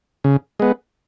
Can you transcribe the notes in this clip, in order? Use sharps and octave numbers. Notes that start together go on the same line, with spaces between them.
C#3
G#3 B3